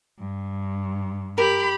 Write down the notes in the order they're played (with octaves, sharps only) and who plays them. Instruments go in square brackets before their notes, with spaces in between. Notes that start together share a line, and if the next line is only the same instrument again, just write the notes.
[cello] G2
[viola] G4 B5 [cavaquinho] A#4